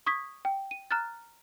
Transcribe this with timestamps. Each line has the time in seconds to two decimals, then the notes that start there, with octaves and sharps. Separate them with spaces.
0.06 C#6 D#6 G#6 B6
0.45 G5
0.71 D#7
0.91 A#5 F6 F#6 A6